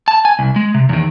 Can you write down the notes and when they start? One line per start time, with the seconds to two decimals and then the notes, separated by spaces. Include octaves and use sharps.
0.08 A5
0.25 G#5
0.39 C2
0.56 G#3
0.74 C3
0.89 E2 D#3